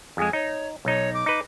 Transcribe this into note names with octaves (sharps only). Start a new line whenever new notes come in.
F2 G#3 G#4
D#4 C#5
B1 D#4 C#5
D6
D#4 B4